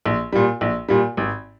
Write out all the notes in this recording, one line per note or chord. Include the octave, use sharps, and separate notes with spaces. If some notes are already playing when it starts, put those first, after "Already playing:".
A#1
A#2 G3
A#1
A#2 G3
G#1